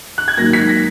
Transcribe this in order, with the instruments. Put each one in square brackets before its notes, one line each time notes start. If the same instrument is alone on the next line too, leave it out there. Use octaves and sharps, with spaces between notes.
[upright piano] F#6
G#6
G#2 D#3 F#3 A#3 A#6
B6
A#6